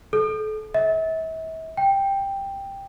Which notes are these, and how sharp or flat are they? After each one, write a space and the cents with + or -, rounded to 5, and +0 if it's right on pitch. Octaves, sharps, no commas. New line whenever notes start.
A4 -30
E5 -40
G5 +5